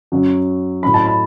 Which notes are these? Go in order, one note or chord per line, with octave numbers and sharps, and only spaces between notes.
F#2 F#3
A2 F#3 B5
A5
B5